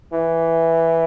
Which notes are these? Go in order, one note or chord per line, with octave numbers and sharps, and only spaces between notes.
E3